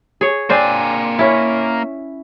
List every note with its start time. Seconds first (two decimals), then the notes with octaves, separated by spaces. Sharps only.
0.21 G#4 C#5
0.50 A#3 C4 D4 C5 G#5
1.19 C#4 E4